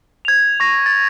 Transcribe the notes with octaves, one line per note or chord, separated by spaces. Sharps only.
G#6 F7
C#6 A#6
A6